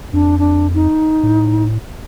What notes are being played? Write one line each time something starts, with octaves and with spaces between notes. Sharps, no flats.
F2 D4
D4
D#4
A2